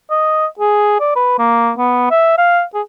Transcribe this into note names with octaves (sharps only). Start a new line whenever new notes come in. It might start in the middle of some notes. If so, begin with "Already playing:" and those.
D#5
G#4
D5
B4
A#3
B3
E5
F5
G#4